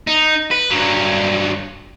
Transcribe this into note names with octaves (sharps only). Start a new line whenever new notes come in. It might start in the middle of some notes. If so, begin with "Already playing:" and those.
D#4
B4
G2 F#3